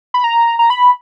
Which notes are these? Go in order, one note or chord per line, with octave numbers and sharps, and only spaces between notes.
B5
A#5
A#5
B5